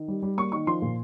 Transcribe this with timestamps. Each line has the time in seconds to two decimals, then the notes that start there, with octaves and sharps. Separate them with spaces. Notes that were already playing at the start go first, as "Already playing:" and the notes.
Already playing: D#3
0.08 G3
0.23 G3
0.37 A#3 C#6
0.52 D#3 C#6
0.67 F3 C6
0.82 A#2